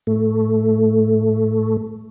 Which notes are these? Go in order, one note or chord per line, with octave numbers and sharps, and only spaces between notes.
A2 A3